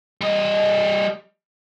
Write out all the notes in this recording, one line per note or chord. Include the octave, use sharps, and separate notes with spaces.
G3 D#5